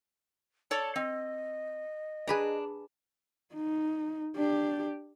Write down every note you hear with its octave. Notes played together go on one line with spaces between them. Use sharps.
A4 C#5 D5 A5
C4 D#5
D4 G#4 B4 A#5
D#4
D4 G4